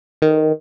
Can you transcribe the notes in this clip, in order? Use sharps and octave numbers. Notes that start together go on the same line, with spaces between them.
D#3